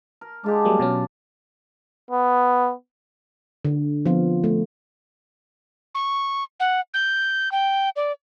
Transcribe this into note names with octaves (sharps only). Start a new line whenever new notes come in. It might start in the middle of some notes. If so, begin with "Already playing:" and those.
A#4
G#3 D4 F4 G4
F#3 G3 A#3
B2 F#3 C#4 F4
B3
D3
F3 B3 C4 F4
A3
C#6
F#5
G6
G5
D5